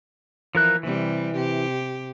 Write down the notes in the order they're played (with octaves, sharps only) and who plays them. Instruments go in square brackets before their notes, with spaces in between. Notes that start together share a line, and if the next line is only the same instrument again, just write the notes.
[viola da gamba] E3 [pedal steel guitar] F3 A#4 F#6
[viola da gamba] C3 G3 [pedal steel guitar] E3
[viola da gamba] C3 G4